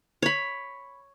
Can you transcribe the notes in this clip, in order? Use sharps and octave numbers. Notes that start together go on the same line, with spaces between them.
C#5 B5